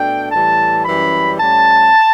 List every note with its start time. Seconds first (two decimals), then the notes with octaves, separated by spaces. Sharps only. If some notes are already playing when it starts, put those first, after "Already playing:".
Already playing: B2 A3 D4 G5
0.31 A2 E3 G3 A5
0.85 F#2 E3 G3 C#4 B5
1.38 A2 G3 C#4 A5